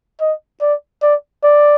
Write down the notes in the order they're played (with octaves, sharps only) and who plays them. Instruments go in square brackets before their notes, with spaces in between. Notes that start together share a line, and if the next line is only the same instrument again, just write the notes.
[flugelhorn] D#5
D5
D5
D5